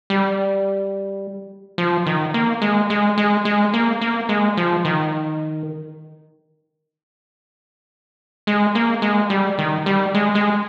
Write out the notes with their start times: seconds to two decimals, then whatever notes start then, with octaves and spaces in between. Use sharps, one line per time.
0.10 G3
1.78 F3
2.06 D#3
2.34 A#3
2.62 G#3
2.90 G#3
3.18 G#3
3.45 G#3
3.74 A#3
4.02 A#3
4.29 G#3
4.57 F3
4.85 D#3
8.47 G#3
8.75 A#3
9.02 G#3
9.30 G3
9.59 D#3
9.86 G3
10.14 G#3
10.35 G#3